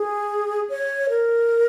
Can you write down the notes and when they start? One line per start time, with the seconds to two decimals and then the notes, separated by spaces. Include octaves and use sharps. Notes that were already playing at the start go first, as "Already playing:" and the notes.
Already playing: G#4
0.69 C#5
1.09 A#4